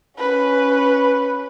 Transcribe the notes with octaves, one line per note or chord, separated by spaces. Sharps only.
C#4 B4